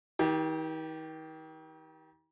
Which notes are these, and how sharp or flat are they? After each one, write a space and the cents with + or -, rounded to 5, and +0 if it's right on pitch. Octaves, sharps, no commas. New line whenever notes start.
D#3 +40 G4 -5